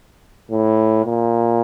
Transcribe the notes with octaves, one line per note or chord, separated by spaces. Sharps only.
A2
A#2